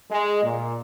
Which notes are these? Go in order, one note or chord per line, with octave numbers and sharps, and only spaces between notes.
G#3
A#2